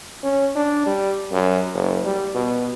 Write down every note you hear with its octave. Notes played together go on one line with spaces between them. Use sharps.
C#4
D4
G3
F#2
F#1
G3
B2